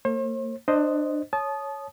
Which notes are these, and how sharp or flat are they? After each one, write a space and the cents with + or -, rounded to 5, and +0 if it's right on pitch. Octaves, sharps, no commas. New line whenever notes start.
A#3 -40 C5 +45
D4 +25 C5 +0 D#5 +0
C#5 +0 A5 -30 D#6 -10